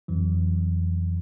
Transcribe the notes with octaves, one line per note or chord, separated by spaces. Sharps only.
F2 E3 F#3